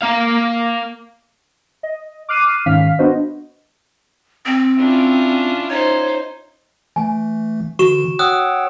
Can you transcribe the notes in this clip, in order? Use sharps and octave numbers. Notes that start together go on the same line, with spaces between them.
A#3 F5
D#5
D6 F6 F#6 C7 D#7
G#2 D#3 C#4 F5 F6 B6
B3 D4 F#4 C5 D#5
C4
C#4 D4 E4 F4
D#4 C5 C#5
E3 A3 G#5
D3 E3 F#4 C#6 E7
C#5 F#5 G5 D#6 E6 F#6